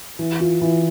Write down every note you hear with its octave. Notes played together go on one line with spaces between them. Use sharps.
E3
F4
E3